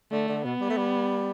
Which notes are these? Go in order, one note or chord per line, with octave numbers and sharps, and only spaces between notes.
D3 A3
D3
B2 B3
G3
A3
G3